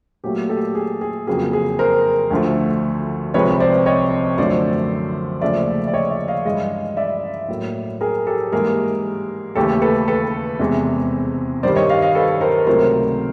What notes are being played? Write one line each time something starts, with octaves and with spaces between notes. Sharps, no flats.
A#2 F#3 A3 G4
G4 A4
G#4
G#4
F2 C#3 F#3 A#3 G#4
G#4
A#4 C5
D2 D3 F3 A3
C2 C3 F3 G#3 B4 C#5
C5 D5
C#5 D#5
F#2 D3 F3 A3 C5 D5
D#2 C#3 F3 A3 D5 E5
D5
C#5 D#5
D5 E5
D#5 F5
G2 E3 G#3 D#5 F5
D5 E5
A2 F#3 A#3
G#4 A#4
G4 A4
G#2 E3 G3 A#3 G#4 A#4
D#2 C#3 E3 A3 G4 A4
A4 B4
A4 B4
E2 C3 E3 G#3
G2 D#3 G3 C5 D5
C#5 D#5
D#5 F5
D#5 F5
A4 B4
A#4 C5
C#2 C3 D#3 F#3 A3 A#4 C5